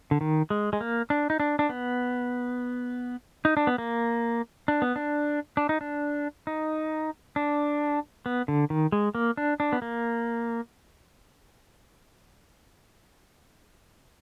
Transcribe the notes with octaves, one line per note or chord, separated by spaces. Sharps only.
D3
D#3
G#3
G#3
A#3
D4
D#4
D4
D4
B3
D#4
D4
B3
A#3
D4
B3
D4
D4
D#4
D4
D#4
D4
B3
D3
D#3
G#3
A#3
D4
D4
B3
A#3